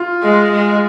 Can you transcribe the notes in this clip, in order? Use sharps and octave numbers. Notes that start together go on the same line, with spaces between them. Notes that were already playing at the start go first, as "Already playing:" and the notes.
Already playing: F4
G#3
G#3